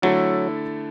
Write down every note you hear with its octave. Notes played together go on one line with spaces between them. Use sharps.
D3 F#3 A3 E4 A4